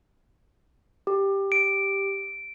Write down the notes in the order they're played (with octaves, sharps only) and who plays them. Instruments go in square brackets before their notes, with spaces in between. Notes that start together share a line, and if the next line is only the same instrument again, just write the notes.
[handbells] G4
[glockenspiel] D7